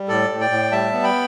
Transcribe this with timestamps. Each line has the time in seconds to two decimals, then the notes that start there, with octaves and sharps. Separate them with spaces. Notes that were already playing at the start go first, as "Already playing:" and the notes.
Already playing: G3
0.08 A2 A4 D5
0.30 A2
0.40 D5 G5
0.51 A2
0.72 G3 E5 A5
0.93 B3
1.04 G5 B5